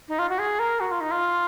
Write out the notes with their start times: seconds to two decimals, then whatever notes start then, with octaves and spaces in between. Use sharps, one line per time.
0.08 D#4
0.19 F4
0.29 F#4
0.39 G#4
0.59 A#4
0.80 F#4
0.91 F4
1.01 D#4
1.11 F4